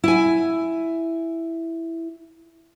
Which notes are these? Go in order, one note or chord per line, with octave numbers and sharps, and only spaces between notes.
E4 G#5